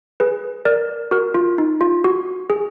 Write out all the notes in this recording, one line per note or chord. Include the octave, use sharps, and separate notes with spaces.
G#4 B4
A#4 D5
F#4 A#4
F4
D#4
F4
F#4
G#4